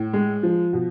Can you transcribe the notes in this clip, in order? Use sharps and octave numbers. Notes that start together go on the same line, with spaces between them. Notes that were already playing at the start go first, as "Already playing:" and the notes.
Already playing: A2
G#3
F3
B2